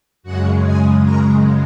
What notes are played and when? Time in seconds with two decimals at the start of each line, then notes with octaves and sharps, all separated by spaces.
0.23 F#2 C#3 G#3 F#4 F#5
0.62 G#4 G#5
1.02 A#4 A#5